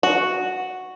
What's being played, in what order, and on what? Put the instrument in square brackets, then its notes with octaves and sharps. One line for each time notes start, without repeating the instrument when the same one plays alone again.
[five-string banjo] F#4